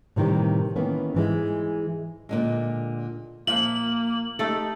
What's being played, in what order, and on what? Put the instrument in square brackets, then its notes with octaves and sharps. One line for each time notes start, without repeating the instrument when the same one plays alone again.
[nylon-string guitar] A2 C3 D#3 E3 G3
D#3 E3 A#3 B3 C#4
G#2 E3 G#3
A#2 D3 G#3
[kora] A#2 F3 [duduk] A#3 [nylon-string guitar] E5 [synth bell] F#7
[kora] A3 A4 [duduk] D#4 [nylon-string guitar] G4